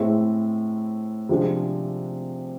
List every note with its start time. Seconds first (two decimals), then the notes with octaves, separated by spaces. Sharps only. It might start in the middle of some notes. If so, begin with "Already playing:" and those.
Already playing: A2 G#3 C4 E4
1.29 C3 F3 G#3 D4